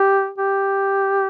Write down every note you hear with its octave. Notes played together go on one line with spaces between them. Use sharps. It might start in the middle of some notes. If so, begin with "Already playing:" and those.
Already playing: G4
G4